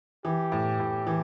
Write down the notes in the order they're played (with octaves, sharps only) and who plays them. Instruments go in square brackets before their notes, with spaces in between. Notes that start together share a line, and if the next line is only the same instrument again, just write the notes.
[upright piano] E3 [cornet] G4
[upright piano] A2
A2
E3